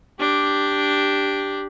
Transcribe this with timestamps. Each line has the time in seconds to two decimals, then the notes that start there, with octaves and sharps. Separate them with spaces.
0.19 D4 G4